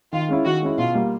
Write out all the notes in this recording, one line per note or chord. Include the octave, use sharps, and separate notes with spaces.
D#3 F4
G#3 C#4 E4
D#3 F#4
G#3 C#4 E4
B2 F4
G3 A#3